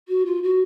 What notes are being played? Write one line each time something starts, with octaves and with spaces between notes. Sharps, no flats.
F#4
F4
F#4